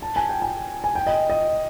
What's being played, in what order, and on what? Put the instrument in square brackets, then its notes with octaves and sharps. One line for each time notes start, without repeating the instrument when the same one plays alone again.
[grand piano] A5
G#5
G5
G#5
G#5
G5
D#5
D#5